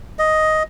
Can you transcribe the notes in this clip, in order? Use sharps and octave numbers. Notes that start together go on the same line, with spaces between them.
D#5